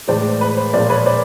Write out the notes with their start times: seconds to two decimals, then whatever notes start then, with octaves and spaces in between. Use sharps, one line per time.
0.08 A2 E3 G#3 C5 D5
0.41 B4
0.57 C5
0.73 A#2 F3 G#3 C5 D5
0.90 B4 C#5
1.06 C5 D5